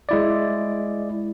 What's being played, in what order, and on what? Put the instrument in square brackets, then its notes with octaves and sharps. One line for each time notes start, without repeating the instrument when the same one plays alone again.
[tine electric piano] G#3 E4 D5